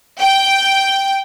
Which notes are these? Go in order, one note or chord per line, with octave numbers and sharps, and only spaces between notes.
G5